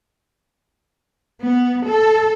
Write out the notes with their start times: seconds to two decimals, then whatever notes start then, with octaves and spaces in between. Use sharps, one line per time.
1.42 B3
1.87 A4